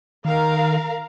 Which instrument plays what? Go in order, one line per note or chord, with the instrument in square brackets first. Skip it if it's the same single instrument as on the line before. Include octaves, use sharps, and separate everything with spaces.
[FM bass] D#3 [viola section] A#4 F5 A#5